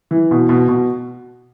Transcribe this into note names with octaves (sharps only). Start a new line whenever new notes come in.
E3
B2
B2
B2